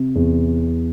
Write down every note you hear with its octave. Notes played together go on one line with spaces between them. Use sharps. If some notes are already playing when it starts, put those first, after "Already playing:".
Already playing: C3
E2